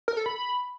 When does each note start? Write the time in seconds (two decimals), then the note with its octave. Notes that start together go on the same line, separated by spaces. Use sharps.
0.08 A#4
0.17 A4
0.26 B5